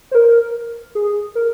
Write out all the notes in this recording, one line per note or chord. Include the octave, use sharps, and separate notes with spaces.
C5
A#4
G#4
A#4